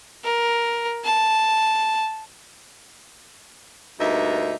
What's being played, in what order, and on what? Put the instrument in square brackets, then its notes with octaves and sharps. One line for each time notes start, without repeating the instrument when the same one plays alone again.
[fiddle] A#4
A5
[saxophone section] D2 G2 A#3 D#4 E5